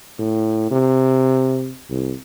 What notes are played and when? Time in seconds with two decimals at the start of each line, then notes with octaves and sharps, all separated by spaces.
0.19 A2
0.71 C3
1.90 C2